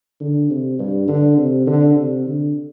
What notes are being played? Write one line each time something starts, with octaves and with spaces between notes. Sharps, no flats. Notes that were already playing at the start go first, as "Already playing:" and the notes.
D3
C3
G2
D3
C3
D3
C3
D3